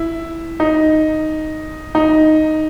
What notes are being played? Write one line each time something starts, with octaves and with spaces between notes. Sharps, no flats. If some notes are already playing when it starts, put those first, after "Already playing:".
Already playing: E4
D#4
D#4